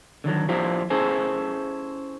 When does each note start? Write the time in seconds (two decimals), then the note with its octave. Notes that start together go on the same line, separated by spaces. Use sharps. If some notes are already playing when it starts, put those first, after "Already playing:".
0.24 D3 D#3 F#3 A4
0.49 F3 D4 E4 F4 G4 C5
0.90 C#4 E4 G#4 A4 C5 G#5